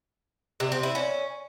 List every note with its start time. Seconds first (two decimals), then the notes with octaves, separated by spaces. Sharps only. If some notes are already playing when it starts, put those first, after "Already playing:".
0.60 C3
0.72 C4
0.83 E4
0.95 C#4